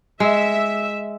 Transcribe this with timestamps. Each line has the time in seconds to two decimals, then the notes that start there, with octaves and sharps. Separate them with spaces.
0.20 G#3 E5